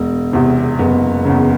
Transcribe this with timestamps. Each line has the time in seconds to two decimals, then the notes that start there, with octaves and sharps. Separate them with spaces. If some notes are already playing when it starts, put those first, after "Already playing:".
Already playing: E1
0.33 E2 C3
0.79 F#1 B3
1.25 E2 C#3